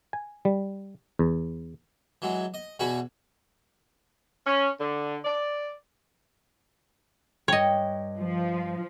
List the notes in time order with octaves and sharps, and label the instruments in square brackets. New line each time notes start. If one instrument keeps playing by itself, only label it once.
[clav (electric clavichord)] G#5
G3
E2
[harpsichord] E3 F#3 G#3
D#5
E2 B2 B3 F#4 G#4 B5
[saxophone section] C#4
D3
D5
[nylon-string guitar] G2 G5 [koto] C#5 D#5
[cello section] F3